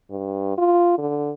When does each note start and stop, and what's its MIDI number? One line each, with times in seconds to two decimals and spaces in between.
0.11 0.53 43
0.58 0.95 65
0.98 1.32 50